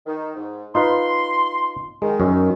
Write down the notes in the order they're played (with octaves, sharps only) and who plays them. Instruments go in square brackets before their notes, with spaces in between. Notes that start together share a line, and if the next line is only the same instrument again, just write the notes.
[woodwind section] D#3
G#2
[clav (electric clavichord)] D#4 F4 B4 [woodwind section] C6
[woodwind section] D#3 [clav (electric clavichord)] G#3
[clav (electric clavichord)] F#2 C#4